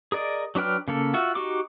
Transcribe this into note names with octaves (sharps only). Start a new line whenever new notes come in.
G#4 A#4 D5 D#5
F#3 D4 B4 G5 F6
C#3 A#3 A4
F4 F#4 E5
D#4 F#4 G4 C#6 D6